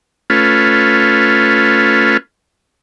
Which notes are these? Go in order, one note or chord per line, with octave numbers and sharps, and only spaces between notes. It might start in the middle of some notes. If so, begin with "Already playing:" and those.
A3 C#4 F4 B4